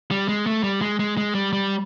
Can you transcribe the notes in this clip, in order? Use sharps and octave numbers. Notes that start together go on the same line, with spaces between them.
G3
G#3
A3
G3
G#3
G#3
G#3
G3
G3